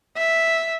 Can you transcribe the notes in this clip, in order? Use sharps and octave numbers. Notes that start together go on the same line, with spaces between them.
E5